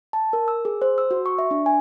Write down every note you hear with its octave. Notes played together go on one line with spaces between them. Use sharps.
A5
A#4
E6
G#4
C5
E6
F#4
C#6
E5
D4
G#5